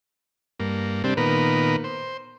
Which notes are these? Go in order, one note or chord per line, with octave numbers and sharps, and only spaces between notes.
G2 A#3
C3 G3 C4 D4
A#2 D#3 B3 A#4 B4
C5